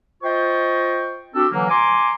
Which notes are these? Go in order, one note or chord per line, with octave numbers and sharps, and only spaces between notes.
F4 C5 D#5 G5 C#6
C4 D4 F#4 G4 A4
D3 E3 F#3 A#3
G#5 A#5 C6 D6